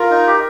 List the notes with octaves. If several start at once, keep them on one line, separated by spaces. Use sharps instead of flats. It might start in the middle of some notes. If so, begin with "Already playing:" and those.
Already playing: F4 A#4
D#4
G4